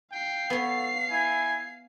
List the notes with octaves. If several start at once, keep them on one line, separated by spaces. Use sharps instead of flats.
F5 G5 C7
B3 A4 C#5
E4 G#5